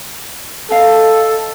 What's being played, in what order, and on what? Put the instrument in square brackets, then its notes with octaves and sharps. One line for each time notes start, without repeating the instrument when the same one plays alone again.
[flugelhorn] A4 [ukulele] D#5 F5